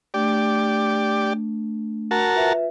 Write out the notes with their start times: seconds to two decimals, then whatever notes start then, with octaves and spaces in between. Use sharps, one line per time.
0.14 A3 D4 G4 D5
2.11 F#4 A#4 A5
2.34 F4 B4 E5